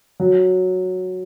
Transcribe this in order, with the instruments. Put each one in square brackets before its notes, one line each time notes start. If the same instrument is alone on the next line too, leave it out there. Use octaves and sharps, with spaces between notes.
[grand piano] F#3